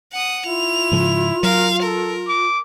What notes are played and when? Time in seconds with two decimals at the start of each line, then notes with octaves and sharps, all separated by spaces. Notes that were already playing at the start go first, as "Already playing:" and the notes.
0.12 F#5 D#6
0.46 E4 F4 F7
0.92 G#2 C#3 F3
1.43 F#3 A#4 F5
1.82 A4 A#4
2.28 D6